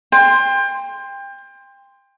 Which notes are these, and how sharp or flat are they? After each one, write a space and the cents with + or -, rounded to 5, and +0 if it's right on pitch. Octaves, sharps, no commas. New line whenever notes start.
G5 +30 C6 +0